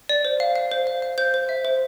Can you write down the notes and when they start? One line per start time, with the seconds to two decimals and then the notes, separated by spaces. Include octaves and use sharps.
0.09 D5
0.25 C5
0.40 F5
0.56 F5
0.72 C5
0.87 F5
1.02 F5
1.18 C5 G6
1.34 C5
1.49 E5
1.65 C5